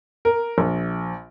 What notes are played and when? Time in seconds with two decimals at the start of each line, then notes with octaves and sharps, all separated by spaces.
0.25 A#4
0.58 A#1